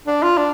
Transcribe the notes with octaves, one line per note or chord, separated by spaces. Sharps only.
D4
F4
D4